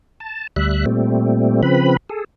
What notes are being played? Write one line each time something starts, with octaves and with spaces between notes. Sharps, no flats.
A5
D2 G3 E5 F#6
A#2 G3 A3 C4
C#3 F3 C4 B4 B5
G#4 A4